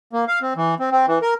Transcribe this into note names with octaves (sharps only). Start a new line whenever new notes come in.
A#3
F5
C4
E3
C4
C4
E3
A#4